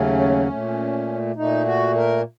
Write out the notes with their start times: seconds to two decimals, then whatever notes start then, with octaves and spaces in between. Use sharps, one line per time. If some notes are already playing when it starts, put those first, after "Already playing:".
Already playing: D#2 C#3 F#3 A3 C#4
0.48 A#2 A3
1.36 A#2 A3 D#4
1.65 F#4
1.95 A#4